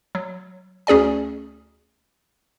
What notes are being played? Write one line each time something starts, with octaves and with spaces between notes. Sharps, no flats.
F#3
D2 C#4 G#4 D5 G#5